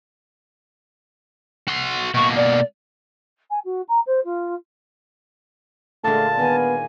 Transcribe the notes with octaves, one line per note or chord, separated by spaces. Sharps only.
F#4 C6
B2 A#3 C#6
D5
G#5
F#4
A#5
C5
F4
A#2 D3 G#3 A3 A5
D#3 B3 G#5